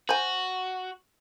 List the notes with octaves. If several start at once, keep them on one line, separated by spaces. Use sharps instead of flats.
F#4 C5 G#5